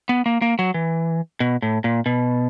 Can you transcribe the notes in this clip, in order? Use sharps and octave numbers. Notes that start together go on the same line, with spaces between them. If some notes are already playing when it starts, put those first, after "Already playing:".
B3
A#3
A#3
F#3
E3
B2
A2
A#2
B2